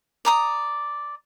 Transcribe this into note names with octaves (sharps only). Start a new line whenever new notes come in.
D5 A#5 D#6